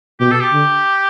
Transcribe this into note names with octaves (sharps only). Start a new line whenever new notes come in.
B2 G4
A4
G4
D3